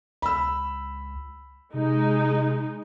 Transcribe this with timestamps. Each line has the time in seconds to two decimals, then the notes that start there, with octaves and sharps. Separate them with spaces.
0.22 C#2 B5 E6
1.74 C3 G#3 D#4